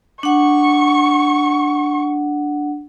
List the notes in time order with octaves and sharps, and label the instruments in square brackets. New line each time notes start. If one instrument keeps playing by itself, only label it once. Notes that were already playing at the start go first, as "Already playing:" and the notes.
[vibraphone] D4 F#5 [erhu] C#6